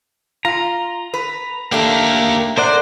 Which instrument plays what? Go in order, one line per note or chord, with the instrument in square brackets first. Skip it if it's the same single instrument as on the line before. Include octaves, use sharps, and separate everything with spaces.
[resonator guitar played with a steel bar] F4 [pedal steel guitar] A#5
[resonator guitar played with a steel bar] B4
[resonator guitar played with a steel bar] A3 D4 [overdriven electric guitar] A#3 G4
[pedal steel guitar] A#4 D5 F#5 [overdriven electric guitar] C5